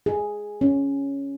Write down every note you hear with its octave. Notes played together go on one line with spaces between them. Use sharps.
G#4
C#4